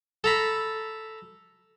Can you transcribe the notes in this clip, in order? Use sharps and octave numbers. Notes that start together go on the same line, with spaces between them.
A4 A#5 B5